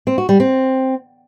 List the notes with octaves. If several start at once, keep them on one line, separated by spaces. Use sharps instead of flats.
C4
F#4
G3
C4